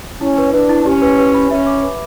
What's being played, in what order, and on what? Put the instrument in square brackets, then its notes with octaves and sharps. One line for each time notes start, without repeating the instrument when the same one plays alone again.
[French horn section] C#4 [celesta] E4
[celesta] B4
[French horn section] D4 [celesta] B4
[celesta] E4
[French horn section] C#4 [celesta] G4
[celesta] B4
B4
B5
[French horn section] C#4 [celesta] E5
[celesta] D6
B4